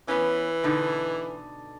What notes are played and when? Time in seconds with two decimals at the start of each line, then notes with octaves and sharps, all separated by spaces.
0.08 E3 B3 C#4
0.63 B2 D3 D#4